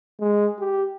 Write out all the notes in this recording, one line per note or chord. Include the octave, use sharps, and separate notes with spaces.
G#3
G4